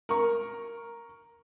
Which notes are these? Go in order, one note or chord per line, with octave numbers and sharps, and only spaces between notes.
A#4 C#6